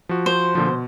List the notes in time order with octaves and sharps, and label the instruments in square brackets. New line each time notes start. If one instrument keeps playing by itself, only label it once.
[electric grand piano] F3 F#4
[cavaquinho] C5
[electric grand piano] A#2 D3 F3
B2